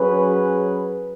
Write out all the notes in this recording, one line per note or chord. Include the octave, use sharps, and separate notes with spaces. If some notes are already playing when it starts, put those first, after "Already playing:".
Already playing: F#3 C#4 G#4 B4